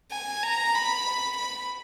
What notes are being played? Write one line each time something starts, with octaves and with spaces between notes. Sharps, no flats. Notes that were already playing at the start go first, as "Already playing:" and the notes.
G#5
A#5
B5
B5